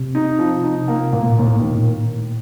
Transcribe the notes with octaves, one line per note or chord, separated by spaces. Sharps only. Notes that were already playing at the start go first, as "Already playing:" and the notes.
Already playing: C3
D#4
F3
D#4
A#3
A2 A#3
A#2
A2
D#2 A#2
A2
A#2
A2 D#3
A#2